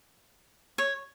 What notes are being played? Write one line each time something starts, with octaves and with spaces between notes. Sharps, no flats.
C#5